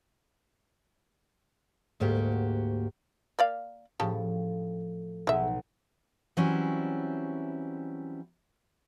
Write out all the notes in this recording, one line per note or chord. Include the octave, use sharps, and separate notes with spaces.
D2 G#2 A#3 F#4 G4
A#3 D5 F5
A2 C#3 F3 G4 A5
B1 G#3 E5
E3 F#3 G3 C4 C#4 E4